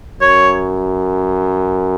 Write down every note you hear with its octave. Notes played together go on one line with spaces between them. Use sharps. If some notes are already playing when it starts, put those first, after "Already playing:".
F#2 C#5